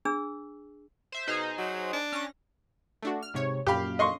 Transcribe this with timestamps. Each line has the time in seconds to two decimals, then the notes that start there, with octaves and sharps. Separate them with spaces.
0.05 D4 G#4 E6
1.12 C5 E5
1.28 B2 D#4 G#4 C5
1.58 F#3
1.93 D4
2.12 C#4 A#6
3.02 A3 D4 F#4
3.23 F6
3.34 G#2 C3 C#5
3.67 F#2 A#2 G4 F5 B5
3.99 D#5 C6 C#6